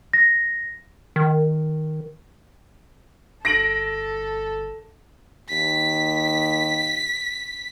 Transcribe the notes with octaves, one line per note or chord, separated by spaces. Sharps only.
A#6
D#3
G1 A4 A#6 D7 F#7
D#2 B6